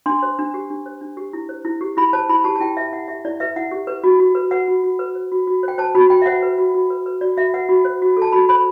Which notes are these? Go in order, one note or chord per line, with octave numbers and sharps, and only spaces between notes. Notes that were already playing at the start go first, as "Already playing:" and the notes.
D4 C6
C5
D4
G4
D4
C5
D4
G4
E4
C5
E4
G4
E4 B5
C5 A5
E4 B5
G4 A5
A5
E4 G5
B4 E5
E4 F#5
G4 E5
E4 D5
B4 E5
E4 F#5
G4
B4
F#4
F#4
B4
B4 F#5
F#4
F#4
B4
C5
F#4
F#4
C5 G5
C5 A5
F#4 B5
F#4 G5
E5
C5 F#5
B4
F#4
F#4
B4
B4
F#4 D5
F#4 E5
B4 F#5
F#4
C5
F#4
A4
A5
F#4 B5
C5 B5